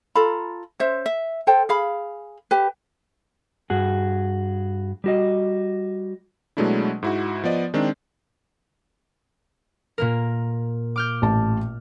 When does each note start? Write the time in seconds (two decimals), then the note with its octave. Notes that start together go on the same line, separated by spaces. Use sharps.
0.15 F4 A4 A#5 B5
0.80 C#4 C5 E5
1.06 E5
1.47 A4 C5 G5
1.69 G#4 F5 B5
2.51 G4 B4
3.70 G2 F#4 G#4
5.04 G3 F#4 D#5
6.57 B2 F#3 G#3 A3 D4 E4
7.03 G#2 E4 F#4
7.44 F3 B3 D5 D#5
7.74 D#3 G#3 C4 D4
9.98 A#2 A#3 A#4
10.96 D6 F6 G6
11.22 A1 A5